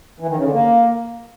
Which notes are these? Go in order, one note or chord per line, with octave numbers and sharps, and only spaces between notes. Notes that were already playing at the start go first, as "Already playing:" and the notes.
E3
D#3
C#3
D3
A#3